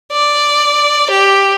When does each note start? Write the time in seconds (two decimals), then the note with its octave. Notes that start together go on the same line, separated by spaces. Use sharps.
0.12 D5
1.10 G4